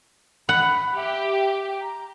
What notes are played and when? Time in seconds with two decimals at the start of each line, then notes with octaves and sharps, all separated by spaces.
0.49 F#5 B5
0.96 G4 E5
1.81 A#5